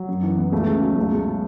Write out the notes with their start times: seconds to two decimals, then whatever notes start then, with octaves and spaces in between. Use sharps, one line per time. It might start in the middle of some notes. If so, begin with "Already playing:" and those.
Already playing: F#3
0.08 F#2
0.22 E3
0.37 B3
0.52 C#2 A3
0.67 C#3
0.82 F#3
0.96 C#2
1.12 B2
1.26 F#3